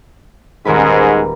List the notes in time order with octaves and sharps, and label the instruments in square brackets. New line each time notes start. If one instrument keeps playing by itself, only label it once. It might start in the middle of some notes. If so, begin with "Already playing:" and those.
[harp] D#1 A#4 B4 [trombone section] G#2